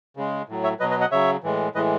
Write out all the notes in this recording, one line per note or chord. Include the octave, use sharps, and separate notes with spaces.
C#3 G#3
A2 F#3
C#5 E5
B2 F#3 B4 D#5
B4 D#5
D#5 F#5
C#3 F#3 C#5 E5
A2 E3 G#3
A2 E3 G#3 B4 D#5